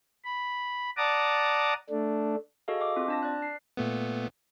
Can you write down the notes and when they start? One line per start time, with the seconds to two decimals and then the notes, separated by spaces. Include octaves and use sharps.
0.25 B5
0.97 D5 F#5 A5 A#5 D6 D#6
1.90 A3 D4
2.68 F#4 G#4 A4 D#5 F5
2.81 D#5 F5 D6
2.96 C4 F4
3.08 D4 A5 A#6
3.23 D5 F#6
3.42 C7
3.77 A#2 A3 B3